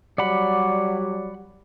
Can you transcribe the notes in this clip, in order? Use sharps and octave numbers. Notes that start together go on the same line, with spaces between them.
F#3 G3 D5 F#5 B5